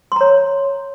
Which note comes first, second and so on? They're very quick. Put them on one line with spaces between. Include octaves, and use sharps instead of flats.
C6 A#5 C#5